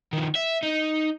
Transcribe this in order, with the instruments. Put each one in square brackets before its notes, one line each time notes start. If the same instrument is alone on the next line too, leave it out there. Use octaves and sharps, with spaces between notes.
[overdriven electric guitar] D#3 F3
E5
D#4